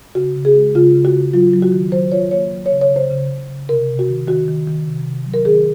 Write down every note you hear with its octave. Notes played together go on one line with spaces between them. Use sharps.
C#3 F#4
C#3
G#4
G#3
C#3 F4
C#3
F#4
C#3
F#3 F4
F#3
F#4
D#3
F#3 C5
F4 C#5
A#3 C#5
F#3
C#5
C#3
C#5
C#3
C5
C#3
C#3
C#3
C3 A#4
C3
F#4
D#3
D#3 F#4
D#3
D#3
C3
C3
F#3
A#4
D#3 G#4